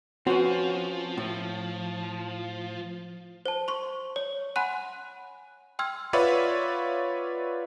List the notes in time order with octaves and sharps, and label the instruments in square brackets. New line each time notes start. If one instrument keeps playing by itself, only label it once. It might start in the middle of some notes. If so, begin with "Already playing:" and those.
[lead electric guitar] F3 [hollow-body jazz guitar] C4 C#4 [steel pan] F#4 B4 F#5
[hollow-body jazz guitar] A2
[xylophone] C5 A5
C6 C#6
C#5
F#5 G#5 B5 C6 F#6 D#7
G5 C6 E6 F6 G#6
[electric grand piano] F4 B4 C#5 D5 E5 F#5